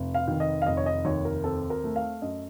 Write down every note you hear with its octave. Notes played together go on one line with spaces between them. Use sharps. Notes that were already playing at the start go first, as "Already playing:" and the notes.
Already playing: F1
F5
D#3
D#5
F5
F1 D#5
C#5
D#5
D#2 C#5
A#4
C4 A4
A#4
A3
F5
F#2 D#5